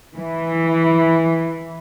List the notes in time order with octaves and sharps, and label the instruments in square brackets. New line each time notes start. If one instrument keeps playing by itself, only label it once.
[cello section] E3